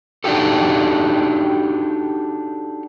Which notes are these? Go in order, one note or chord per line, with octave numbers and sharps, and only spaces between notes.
D4 D#4 F#4 G4 A4